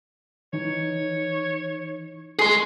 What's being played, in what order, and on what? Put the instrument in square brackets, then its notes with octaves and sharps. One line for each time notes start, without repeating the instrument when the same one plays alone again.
[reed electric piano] E3 D#4 [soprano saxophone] C#5
[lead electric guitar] G#4 C6 [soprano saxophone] C#6 [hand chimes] C7